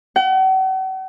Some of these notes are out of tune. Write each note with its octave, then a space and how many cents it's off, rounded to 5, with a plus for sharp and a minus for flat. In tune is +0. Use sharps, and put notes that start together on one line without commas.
F#5 +45